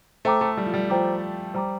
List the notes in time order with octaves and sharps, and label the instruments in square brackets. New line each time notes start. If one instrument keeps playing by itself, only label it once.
[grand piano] A3 [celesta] C5 G5 A#5 D6
[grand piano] A3
G3
F3
G3
[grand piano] F3 [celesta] C5 G5 A#5 D6
[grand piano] G3 [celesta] C5 G5 A#5 D6